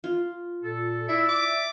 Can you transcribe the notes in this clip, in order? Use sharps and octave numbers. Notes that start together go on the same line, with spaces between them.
F4
A#2 A4
E4 D5 E5
D6